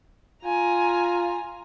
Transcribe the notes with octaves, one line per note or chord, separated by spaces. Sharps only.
F4 G#5 A#5